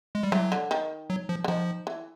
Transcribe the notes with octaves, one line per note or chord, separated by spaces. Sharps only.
G#3
G3
E3 F#3
D3
D#3
F#3
F3
D3
D#3 F3
E3